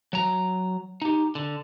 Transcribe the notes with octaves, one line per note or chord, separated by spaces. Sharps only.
F#3 A#5
D#4 G4
D3